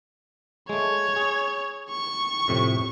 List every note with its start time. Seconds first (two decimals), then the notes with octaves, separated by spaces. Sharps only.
0.69 G#3 A3 C#5
1.16 G#4
1.90 C#6
2.48 F2 A2 C3